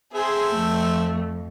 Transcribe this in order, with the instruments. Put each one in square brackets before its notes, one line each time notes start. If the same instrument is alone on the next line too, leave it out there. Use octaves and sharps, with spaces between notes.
[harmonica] C4 A4 E5 [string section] G#4 C6
[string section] F2 [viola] A3